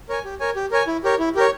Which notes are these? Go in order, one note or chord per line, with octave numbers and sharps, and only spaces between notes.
A#4 C#5 G#5
G4
A#4 C#5 G#5
G4
A#4 C#5 G#5
E4
G4 A#4 C#5
E4
G4 A#4 C#5